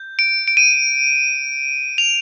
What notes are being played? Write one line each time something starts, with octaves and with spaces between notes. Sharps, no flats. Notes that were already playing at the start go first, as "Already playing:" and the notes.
Already playing: G6
D7
D7
D#7
F7